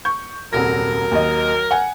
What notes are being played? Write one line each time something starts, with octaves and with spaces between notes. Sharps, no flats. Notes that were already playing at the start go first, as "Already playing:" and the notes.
C#6 G6
D#1 C2 F#3 A#4 A#6
D#2 D#5
F#5 G#5